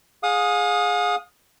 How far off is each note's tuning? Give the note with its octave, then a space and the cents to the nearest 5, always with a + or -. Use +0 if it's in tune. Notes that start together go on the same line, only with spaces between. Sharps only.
G#4 +0 F5 +40 D#6 +0